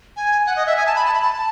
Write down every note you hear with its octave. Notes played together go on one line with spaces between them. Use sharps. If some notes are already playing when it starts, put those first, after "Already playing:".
G#5
F#5
D#5
E5
G#5
A5
B5
A5
B5
A5